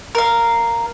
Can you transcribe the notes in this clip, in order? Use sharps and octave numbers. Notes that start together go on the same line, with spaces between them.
A#4 F5